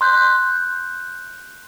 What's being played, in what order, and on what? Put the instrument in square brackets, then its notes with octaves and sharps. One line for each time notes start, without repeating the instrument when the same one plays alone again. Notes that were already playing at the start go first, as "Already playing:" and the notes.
[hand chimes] C6 F#6 G6